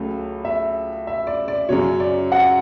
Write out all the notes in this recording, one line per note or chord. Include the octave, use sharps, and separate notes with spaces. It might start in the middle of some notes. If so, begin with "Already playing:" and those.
Already playing: C#2 C#3 F#3 A3
E5
E5
D5
D5
F#2 C#3 F#3 C#5
D5
F#5